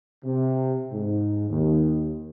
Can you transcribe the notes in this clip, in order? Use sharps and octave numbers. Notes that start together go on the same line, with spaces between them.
C3
G#2
D#2